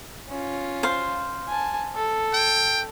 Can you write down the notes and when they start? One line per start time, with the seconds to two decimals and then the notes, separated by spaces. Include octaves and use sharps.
0.29 C#4 F4
0.83 C5 F5
1.48 G#5 A5
1.95 A4
2.34 G5